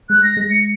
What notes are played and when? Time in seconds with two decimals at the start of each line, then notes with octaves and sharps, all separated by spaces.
0.09 G#3 F#6
0.23 A#6
0.37 G#3 A#6
0.50 C#7